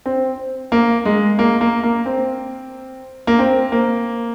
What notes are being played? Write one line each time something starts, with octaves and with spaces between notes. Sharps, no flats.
C4
A#3
G#3
A#3
A#3
A#3
C4
A#3
C4
A#3